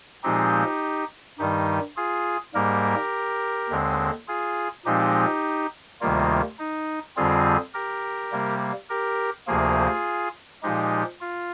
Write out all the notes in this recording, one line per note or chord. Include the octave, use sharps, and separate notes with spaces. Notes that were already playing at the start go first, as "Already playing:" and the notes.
A#2 F3 G#3 C4 D#4 G4
G2 D#3 G3 D#4 G4
F4 G#4
G#2 G3 A#3 G4 A#4
D#2 D3 G#3 C4
F4 G#4
A#2 F3 G#3 C4 D#4 G4
D2 C3 D#3 G3 A#3 F4
D#4
F2 D3 G3 C4 F4 G#4
G4 A#4
C3 G3 A#3
G4 A#4
D2 C3 F3 A#3 F4 G#4
A#2 F3 G#3 D#4 G4
F4